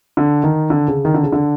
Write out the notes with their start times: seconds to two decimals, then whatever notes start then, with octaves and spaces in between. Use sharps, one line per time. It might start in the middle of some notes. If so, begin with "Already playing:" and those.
0.17 D3
0.44 D#3
0.70 D3
0.88 C#3
1.05 D#3
1.14 D3
1.23 C#3
1.32 D3